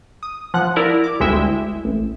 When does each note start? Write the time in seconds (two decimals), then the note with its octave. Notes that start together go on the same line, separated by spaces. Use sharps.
0.23 D#6
0.54 F3 F#5 F#6
0.76 E4 A#4 D5
1.04 D6
1.20 G1 D2 G#3 E4 E5 G5
1.85 A1